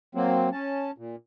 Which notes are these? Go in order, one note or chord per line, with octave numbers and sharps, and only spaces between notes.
F#3 A#3 C4
C#4 A5
A#2